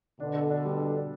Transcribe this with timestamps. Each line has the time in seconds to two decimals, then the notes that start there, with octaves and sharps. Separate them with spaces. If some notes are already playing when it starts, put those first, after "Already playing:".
0.20 B2 D3 D4
0.35 A4
0.50 D4
0.65 G3
0.80 A4
0.95 D4